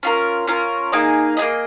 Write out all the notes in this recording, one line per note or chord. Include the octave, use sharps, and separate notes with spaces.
C#4 F4 A#4
C#4 F4 A#4
A#3 D#4 G#4 D#5
A#3 D#4 G#4 D#5